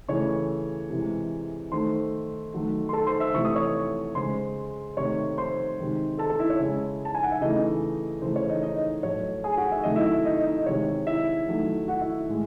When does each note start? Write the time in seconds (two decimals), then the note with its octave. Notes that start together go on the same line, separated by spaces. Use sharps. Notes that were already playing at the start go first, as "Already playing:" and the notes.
0.09 C#3 E3 A3 C#5 C#6
0.90 C3 E3 G#3
1.72 D#3 A3 C5 C6
2.54 D#3 F#3 A3
2.89 C6
2.93 A4 A5
3.07 C5 C6
3.20 E5 E6
3.34 C3 E3 A3 C#6
3.45 D#6
3.56 C#5 C#6
4.15 C#3 G#3 C5 C6
4.97 C3 D#3 A3 C#5 C#6
5.38 C5 C6
5.78 C3 D#3 G#3
6.19 A4 A5
6.29 A4 A5
6.39 E4 E5
6.50 C#5
6.60 C#3 G#3
7.05 A5
7.15 G#5
7.23 F#5
7.32 E5
7.41 C#3 E3 A3 D#4 D#5
8.22 C#3 E3 A3 C5
8.36 C#5
8.49 D#4 D#5
8.63 D#4 D#5
9.03 A2 F#3 A3 C#5
9.44 G#4 G#5
9.57 F#4 F#5
9.72 E5
9.84 C3 D#3 F#3 A3 D#5
9.96 E4 E5
10.25 D#4 D#5
10.46 D#4 D#5
10.66 C3 D#3 G#3 C#5
11.07 E4 E5
11.47 D#3 F#3 A3
11.88 F#4 F#5
12.01 E4 E5
12.29 A2 G#3